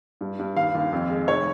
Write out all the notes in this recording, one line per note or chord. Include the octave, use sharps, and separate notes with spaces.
G2
G2
D#2 F5
D#2
F2
G#3
F1 C#5